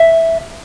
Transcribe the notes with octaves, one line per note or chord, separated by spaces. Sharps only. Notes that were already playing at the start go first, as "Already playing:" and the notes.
Already playing: E5